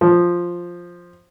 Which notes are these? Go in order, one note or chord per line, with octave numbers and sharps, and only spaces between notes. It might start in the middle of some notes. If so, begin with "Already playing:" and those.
F3